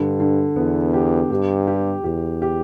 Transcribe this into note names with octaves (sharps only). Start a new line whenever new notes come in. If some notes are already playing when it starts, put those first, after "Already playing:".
Already playing: G2 D3
D3
E2 B3
G4
G2 G4
G4
E2 G4
G4